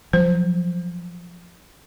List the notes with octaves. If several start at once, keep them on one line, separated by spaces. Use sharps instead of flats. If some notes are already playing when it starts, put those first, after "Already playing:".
F3 F#3 C5